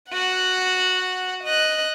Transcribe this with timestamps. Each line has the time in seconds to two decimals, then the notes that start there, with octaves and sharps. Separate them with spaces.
0.11 F#4 F#5
1.44 D#5 F#6